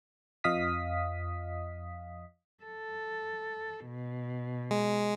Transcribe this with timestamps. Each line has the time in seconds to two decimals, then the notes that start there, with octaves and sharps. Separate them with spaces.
0.44 F2 F3 D#5 F5 D#6 B6
2.64 A4
3.86 B2
4.71 G#3